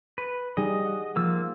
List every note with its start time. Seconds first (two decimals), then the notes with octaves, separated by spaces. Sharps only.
0.18 B4
0.57 G3 D#4 G#4 D#5
0.85 F#5
1.16 F3 A#3 E6 A6